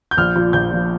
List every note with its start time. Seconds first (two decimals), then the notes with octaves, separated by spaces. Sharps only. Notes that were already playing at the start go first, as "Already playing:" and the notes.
0.11 G6
0.17 A#1 F6
0.36 A#2 F3
0.53 A#1 G6
0.71 A#2 F3